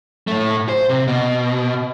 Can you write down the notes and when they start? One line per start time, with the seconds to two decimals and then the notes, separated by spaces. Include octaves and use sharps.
0.27 A2 A3
0.69 C5
0.89 C3
1.08 B2